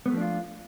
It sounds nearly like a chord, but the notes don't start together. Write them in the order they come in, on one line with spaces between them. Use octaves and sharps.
B3 A3 F3 D4 F4